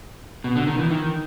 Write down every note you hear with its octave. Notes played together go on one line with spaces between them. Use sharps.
B2
D3
D#3
E3
D#3